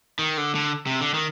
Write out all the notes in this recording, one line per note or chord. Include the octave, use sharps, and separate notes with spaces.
D#3
D3
D3
C3
D3
D#3